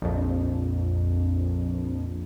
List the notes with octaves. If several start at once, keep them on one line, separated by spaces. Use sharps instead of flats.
A#1 F2